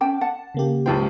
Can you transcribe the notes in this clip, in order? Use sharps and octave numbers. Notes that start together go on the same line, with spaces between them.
C#4 G5 A5 D6
F#5 A5
C#3 A#3 G4
C#2 F3 C5 G5